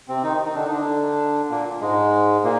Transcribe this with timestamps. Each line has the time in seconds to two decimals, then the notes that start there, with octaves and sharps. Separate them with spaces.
0.09 C3 C4
0.23 D#3 D#4
0.45 D#3 D#4
0.55 D3 D4
0.66 D#4
0.71 D3 D4
1.50 A#2 A#3
1.81 G#2 G#3
2.44 A#2 A#3